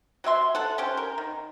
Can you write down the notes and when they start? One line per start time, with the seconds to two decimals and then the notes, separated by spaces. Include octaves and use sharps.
0.24 F#3 G4 E5 C6
0.55 A4 F#5
0.78 C#4 G4 C5
0.97 A#4
1.18 D#3